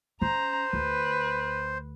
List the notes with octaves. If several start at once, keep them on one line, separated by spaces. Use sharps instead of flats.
C#4 C5 A#5
D2 B4